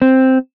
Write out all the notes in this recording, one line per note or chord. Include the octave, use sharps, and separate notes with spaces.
C4